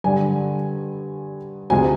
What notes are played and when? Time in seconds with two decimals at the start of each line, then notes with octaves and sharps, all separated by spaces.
0.04 G2 D3 G3 G#5
1.70 D2 C3 F3 G#3 G#5